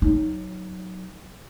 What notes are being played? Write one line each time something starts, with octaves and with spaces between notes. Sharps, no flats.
F#3 D#4